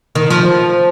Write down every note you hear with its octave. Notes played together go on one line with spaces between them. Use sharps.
D#3
F3